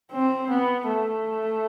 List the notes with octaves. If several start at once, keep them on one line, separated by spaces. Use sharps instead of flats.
C4
B3
A3